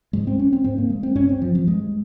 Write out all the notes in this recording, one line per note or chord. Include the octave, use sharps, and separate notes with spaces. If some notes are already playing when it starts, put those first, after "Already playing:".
G#2 G#3
C4
C#4
C4
G#2 C4
A#3
G#3
C4
G2 C#4
C4
F3
F3
G2 G#3